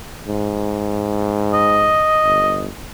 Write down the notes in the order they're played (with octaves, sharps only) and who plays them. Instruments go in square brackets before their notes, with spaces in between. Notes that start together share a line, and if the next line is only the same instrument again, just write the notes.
[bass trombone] G#2
[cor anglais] D#5
[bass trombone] G1